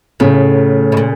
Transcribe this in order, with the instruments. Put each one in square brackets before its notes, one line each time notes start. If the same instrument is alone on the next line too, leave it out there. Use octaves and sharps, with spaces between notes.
[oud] A2 [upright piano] C#3
[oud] B2
A#2